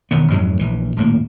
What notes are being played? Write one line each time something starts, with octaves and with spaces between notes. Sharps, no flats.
E1 D#3 B3
F2 G#2 F#3 G#3
A#1 E3
D#1 A2 A#3